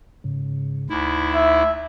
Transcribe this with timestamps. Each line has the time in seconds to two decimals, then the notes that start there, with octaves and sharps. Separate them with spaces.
0.24 G#2 C#3
0.90 D2 D#4 E4
1.34 E5